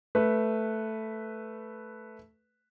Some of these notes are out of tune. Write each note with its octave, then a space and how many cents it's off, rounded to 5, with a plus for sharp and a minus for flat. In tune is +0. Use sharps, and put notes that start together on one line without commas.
A3 +0 B4 +0